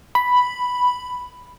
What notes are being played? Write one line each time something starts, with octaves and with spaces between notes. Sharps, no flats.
B5